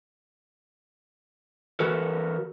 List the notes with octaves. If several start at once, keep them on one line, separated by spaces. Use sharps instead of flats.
E3 F#4 A4 A#4